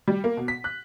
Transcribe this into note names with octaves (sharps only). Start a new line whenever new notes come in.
G3
A#3
B2
B6
F#6